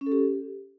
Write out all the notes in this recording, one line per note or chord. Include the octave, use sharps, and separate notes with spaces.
C#4
A4
G4